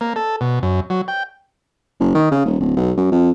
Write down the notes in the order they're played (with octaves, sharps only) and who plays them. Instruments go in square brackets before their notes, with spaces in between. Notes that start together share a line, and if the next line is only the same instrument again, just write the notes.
[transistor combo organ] A#3
A4
B2
F#2
F#3
G5
[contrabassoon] F#1
D#3
C#3
D#1
D1
B1
F#2
F2